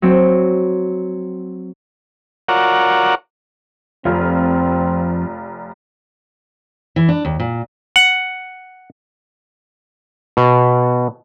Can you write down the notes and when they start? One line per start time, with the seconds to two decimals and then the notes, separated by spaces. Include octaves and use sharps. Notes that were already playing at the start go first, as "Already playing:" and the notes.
0.02 F#3 C4
2.48 F4 F#4 A#4 C#5 D5 F#5
4.05 F1 F2 C4 F4
6.96 E3
7.09 D4
7.25 D#2
7.39 A#2
7.96 F#5
10.37 B2